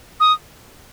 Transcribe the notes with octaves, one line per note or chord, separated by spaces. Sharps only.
D#6